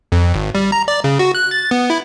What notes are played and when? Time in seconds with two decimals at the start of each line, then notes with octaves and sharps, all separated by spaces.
0.12 F2
0.34 G#1
0.55 G3
0.72 A#5
0.88 D5
1.04 C#3
1.19 F#4
1.35 F#6
1.51 A6
1.71 B3
1.90 E4